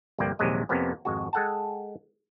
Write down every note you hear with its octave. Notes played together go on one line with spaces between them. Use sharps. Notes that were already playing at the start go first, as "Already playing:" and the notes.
G1 C2 F3 A#3 D5 G5
A#1 D#2 C3 F#3 G#3 D#5
F2 C3 A#3 B3 C#4
G#1 F2 G#3 F#4
G#3 G#4 A4 F#5 G5 A5